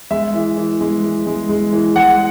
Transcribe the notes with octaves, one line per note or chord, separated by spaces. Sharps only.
G#3 E5
E3
E3
G#3
E3
G#3
G#3
E3
G#3 F#5